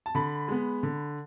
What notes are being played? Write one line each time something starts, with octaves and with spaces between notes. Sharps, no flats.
A5
D3 B5
G#3 B3
D3